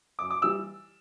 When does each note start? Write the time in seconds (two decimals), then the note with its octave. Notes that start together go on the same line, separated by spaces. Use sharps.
0.19 F#2 D6
0.30 D6
0.42 E3 G3 E6